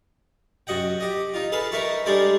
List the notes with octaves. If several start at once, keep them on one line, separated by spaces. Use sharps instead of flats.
F#2 F#4 D#5 F#5 G5
G4 D#5
D#4 F4
G#4 A4 B4 F5 A5
D#4 A#4 B4 E5 A5 C#6
G3 G#3 D4 A4 A#4 C5